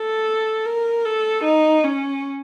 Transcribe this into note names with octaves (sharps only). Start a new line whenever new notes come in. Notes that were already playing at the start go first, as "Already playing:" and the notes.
Already playing: A4
A#4
A4
D#4
C#4